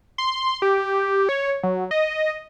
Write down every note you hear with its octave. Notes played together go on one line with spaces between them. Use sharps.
C6
G4
C#5
F#3
D#5